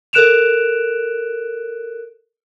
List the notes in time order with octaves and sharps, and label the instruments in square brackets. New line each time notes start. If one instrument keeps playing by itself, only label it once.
[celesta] A4 A#4 F#6 D7 E7 F7